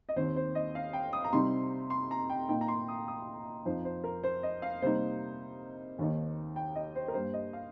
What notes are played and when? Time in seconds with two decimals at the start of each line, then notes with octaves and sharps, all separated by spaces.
0.09 D#5
0.16 D#2 D#3 C4 C5
0.36 C5
0.55 D#5
0.75 F5
0.93 G5
1.13 D#6
1.24 A#5
1.32 C3 G3 C4 D#4 C6
1.90 C6
2.11 A#5
2.30 G5
2.49 A#2 A#3 D#4 G5
2.61 A#5
2.68 C6
2.88 D#6
3.08 D#6
3.65 F2 F3 D#4 C5
3.85 C5
4.04 A#4
4.23 C5
4.43 D#5
4.62 F5
4.82 C3 G3 A#3 D#4 C5
5.99 D#2 D#3 A#3 D#4
6.56 G5
6.75 D#5
6.96 C5
7.08 A#4
7.14 G2 G3 A#3 C5
7.33 D#5
7.53 F5